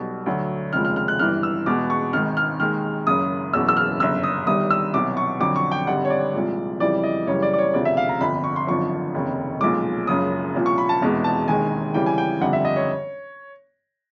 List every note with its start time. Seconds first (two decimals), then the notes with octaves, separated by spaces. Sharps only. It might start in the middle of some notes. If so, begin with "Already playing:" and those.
Already playing: B1 B2 G3
0.26 D2 D3 F#3
0.73 F1 D#2 C#3 F3 G#3 F6
0.85 F6
0.96 F6
1.08 F#6
1.19 G1 G2 E3 F6
1.43 E6
1.66 E2 B2 G#3 D6
1.90 C#6
2.13 G#1 G#2 D#3 G#3 F6
2.37 F6
2.60 D#2 D#3 G#3 F6
3.06 F#1 F#2 C#3 D#6
3.53 F#1 E2 B2 F#3 E6
3.69 E6
3.77 F6
4.00 G1 F#2 C#3 E6
4.23 D#6
4.47 G1 G2 D#3 G3 D#6
4.70 E6
4.94 C2 B2 F#3 D6
5.17 C#6
5.40 F2 D3 F#3 D6
5.56 C#6
5.72 G5
5.87 G#1 G2 D3 G3 F#5
6.05 C#5
6.10 D5
6.34 C2 A#2 F3 G#3
6.80 F2 C#3 E3 G3 D5
7.03 D#5
7.27 F#1 F#2 C#3 E3 G3 C#5
7.42 D5
7.53 D5
7.58 C#5
7.74 E1 D2 C3 F3 D5
7.85 E5
7.97 F5
8.09 A#5
8.21 G1 F2 D3 B5
8.44 C#6
8.56 C6
8.67 G#1 F#2 D3 F3 C#6
9.14 F1 D#2 C#3
9.61 B1 A#2 F3 G#3 D6
10.07 F#1 F#2 C#3 F3 D#6
10.54 C2 A#2 F3
10.66 C#6
10.78 B5
10.89 A5
11.01 F1 E2 B2 G#3
11.24 A5
11.48 E1 D#2 D#3 G#3 G#5
11.94 F2 C#3 E3 G3 G5
12.06 G#5
12.18 G5
12.41 G1 F2 D3 G3 F#5
12.53 E5
12.65 D#5
12.76 C#5